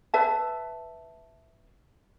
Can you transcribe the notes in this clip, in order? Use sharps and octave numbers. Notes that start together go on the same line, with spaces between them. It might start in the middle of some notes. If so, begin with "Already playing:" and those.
B4 E5 A5